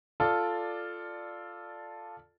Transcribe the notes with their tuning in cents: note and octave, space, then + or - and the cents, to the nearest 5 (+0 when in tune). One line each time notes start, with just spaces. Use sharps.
F4 +0 A4 +0 D5 +10